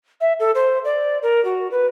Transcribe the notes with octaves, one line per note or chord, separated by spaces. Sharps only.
E5
A4
C5
D5
A#4
F#4
B4